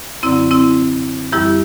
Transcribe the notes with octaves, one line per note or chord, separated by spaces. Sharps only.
F#2 D3 F#3 C4 E4
C4 E4
F#2 E3 G3 E4 G4